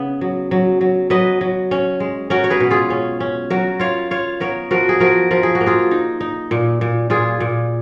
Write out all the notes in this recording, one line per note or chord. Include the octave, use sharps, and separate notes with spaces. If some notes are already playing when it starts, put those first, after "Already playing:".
Already playing: C#3 B3
F#3
F#3
F#3
F#3 B4 D#5
F#3
C#4
G#3
C#4 F#4 A#4
C#5
G#4 B4
B2
F4 G#4
C#4
C#4
F#3 F#4 A#4
F4 C#5 F5
F4 C#5 F5
B3 A#4 C#5
F3 F#4 A#4
G#4
F3 F#4 A#4
F3 A#4
G#4
F#4
A#3
F4 G#4
D#4
D#4
A#2
A#2
A#2 F4 G#4
A#2